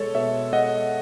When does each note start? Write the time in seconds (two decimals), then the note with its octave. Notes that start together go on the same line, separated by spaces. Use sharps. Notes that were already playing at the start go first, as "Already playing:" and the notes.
Already playing: B2 G#3 A4 C#5
0.15 B2 C#5 E5
0.53 G#3 D#5 F#5